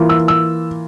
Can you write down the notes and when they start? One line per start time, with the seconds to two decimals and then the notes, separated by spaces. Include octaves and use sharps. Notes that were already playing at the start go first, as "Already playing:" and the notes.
Already playing: E3 A#3 F4
0.09 E6
0.28 E6